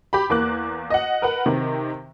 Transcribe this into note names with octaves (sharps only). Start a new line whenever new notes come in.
G4 B5
E2 A#3 D6 F#6
D#5 F#5
A#4 B4 F#5
C3 D#3